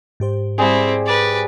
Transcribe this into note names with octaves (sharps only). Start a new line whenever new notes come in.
G#2 G4 C5
G3 C4 E4 G#4
B4 D5